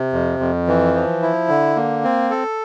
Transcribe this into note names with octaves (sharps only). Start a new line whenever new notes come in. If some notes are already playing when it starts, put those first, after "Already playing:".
Already playing: C3
F2
F2
E3
F3
E4
D3
A#3
C4
A4